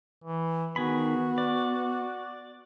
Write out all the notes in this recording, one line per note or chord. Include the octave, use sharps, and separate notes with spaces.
E3
D#3 B3 F#4 G#4 B5
D5